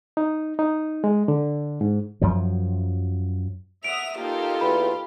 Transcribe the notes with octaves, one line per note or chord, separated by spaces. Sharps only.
D#4
D#4
G#3
D3
G#2
F#2 F3 F#3
E5 F#5 D#6 D7 F7
A#3 D#4 F4 G4 A4
E2 B5